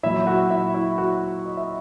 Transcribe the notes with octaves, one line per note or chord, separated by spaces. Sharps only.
A#2 F#3 E4 E5
F#4 F#5
E4 E5
E4 E5
F#4 F#5
D#5
E5